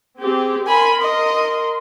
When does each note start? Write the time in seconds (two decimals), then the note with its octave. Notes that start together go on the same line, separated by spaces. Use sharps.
0.19 C4 G4 G#4
0.67 A#4 G#5 B5 C6
1.02 D#5